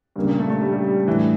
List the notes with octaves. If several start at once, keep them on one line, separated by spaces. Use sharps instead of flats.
G2 C#3 G3 A#3 C#4
A#2
A3
A3
G3
G3
G3
A2 E3 G3 D4